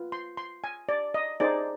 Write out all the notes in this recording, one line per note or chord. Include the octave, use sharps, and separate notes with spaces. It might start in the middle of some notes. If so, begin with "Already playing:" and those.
Already playing: F4 B4
C6
C6
G#5
D5
D#5
D#4 G#4 C5 D5